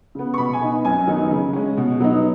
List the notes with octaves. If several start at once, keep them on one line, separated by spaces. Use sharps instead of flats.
C#3 B3
C#6
B2 B5
G#5
B3 D#4
F#2 G#5
D#3 F#3 B3 D#4
C#3
G#3 C#4
B2
F#3 B3 D#4